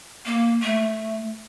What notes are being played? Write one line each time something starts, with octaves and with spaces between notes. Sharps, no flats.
A#3
A3